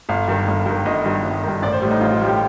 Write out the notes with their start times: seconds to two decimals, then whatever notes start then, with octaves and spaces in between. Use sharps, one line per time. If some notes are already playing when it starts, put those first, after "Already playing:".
0.09 G1 F5
0.28 G2 D#3
0.48 G1
0.66 G2 D#3
0.85 G1 D#5
1.05 G2 D#3
1.24 G1
1.43 D#3
1.48 G2
1.62 A1 D5
1.72 C5
1.82 A2 G3
1.91 D#4
2.01 A1 F4
2.13 F4
2.20 A2 G3
2.27 G4